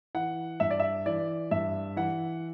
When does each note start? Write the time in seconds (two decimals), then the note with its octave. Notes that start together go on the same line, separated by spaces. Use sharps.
0.15 E3 F#5
0.60 G2 E5
0.71 D5
0.80 E5
1.06 E3 D5
1.51 G2 E5
1.96 E3 F#5